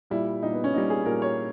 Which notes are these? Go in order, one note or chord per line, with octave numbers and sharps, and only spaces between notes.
A#2 G3 E4
A#2 G3 D#4
B3
C#4
A#2 G3 D#4
G#4
A#2 G3 A#4
C#5